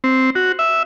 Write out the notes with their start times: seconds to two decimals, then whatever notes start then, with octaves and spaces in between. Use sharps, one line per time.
0.04 C4
0.35 F#4
0.59 E5